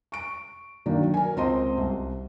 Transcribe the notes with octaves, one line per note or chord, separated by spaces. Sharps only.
C#6 D7
D#3 F#3 A#3 D4
A#4 G#5
C#2 C4 C5 D#5 C6
C2